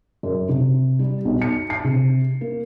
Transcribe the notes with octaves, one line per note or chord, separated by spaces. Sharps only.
F#2
C3
G3
B1
C#7
C7
C3
A#3